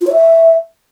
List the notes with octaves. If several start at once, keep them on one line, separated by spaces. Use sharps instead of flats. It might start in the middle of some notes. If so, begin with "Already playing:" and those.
F4
C#5
E5